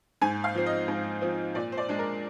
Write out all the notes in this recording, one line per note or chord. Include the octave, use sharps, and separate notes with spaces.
G#2 G#5
F5
F3 C4
D#5
G#2
F3 C4
A#2 D5
C5
D5
G#3 D4
A#4